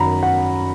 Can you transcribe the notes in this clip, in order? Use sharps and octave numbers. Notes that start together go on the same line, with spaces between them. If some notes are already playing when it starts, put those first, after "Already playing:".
Already playing: F#2 D#3 F#3 A#5 B5
F#5